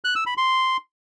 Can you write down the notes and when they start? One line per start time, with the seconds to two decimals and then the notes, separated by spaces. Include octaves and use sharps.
0.05 F#6
0.15 E6
0.26 B5
0.37 C6